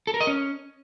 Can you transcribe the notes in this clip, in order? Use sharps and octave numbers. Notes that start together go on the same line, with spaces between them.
A4
A#4
D#5
C#4